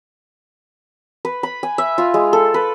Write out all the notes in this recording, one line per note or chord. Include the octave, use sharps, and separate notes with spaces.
B4
B5
G#5
E5
F4
G#3
A4
B4